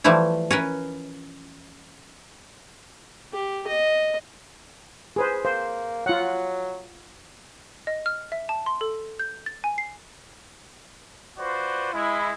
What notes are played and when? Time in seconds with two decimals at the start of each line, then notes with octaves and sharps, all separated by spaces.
0.04 E3 F3 G3 A3 E4
0.51 C#4 A#4 B4
3.33 G4
3.67 D#5
5.16 G#4 B4 C5
5.45 A#3 C5
6.06 F#3 F4 F#5
7.87 D#5
8.06 F6
8.32 E5
8.49 A5
8.66 C6
8.81 A4
9.19 G6
9.46 A6
9.64 G#5
9.78 C7
11.38 F4 F#4 B4 C5 D5
11.93 G#3 E4